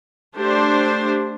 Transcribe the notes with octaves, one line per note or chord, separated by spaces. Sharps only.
A3 D4 G4 C5